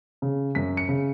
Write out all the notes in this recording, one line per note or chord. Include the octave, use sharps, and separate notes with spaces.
C#3
F#2 B6
C#7
C#3